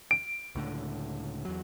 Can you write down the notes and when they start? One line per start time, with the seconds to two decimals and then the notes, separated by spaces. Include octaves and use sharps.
0.11 D7
0.55 C#2 A2 D3
1.45 E2 F#3